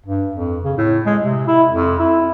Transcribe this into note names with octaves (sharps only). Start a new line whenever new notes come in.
G2
F2
C#3
A2
G#3
C3
E4
F2
E4